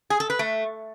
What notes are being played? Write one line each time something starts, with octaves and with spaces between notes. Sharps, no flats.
G#4
A4
B4
A3